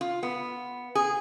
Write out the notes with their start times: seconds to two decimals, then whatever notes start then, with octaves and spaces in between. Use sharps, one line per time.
0.01 F4
0.23 B3
0.95 G#4